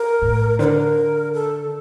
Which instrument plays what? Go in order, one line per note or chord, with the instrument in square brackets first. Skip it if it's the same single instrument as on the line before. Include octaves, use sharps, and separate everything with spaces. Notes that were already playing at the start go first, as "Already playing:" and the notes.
Already playing: [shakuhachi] A#4
[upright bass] A2
[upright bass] D3 [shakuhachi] C5
[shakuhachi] A#4
A4